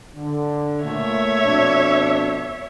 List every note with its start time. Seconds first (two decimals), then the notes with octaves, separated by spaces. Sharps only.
0.16 D3
0.84 A#2 A3 C#5 E5
1.44 F2 B2 D4